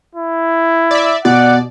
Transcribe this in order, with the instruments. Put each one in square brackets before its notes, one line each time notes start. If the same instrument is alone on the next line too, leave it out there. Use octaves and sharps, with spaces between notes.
[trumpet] E4
[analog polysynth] D5 E5
[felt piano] B2 [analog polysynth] D5 [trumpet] F#5